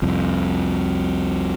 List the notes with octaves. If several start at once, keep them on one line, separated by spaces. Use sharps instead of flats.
C2 F2